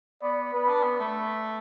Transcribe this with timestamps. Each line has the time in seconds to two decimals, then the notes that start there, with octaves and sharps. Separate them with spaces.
0.22 B3 D5
0.53 B3 B4
0.68 D4
0.83 B3
0.99 A3